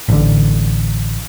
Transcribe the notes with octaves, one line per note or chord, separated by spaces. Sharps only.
A1 D3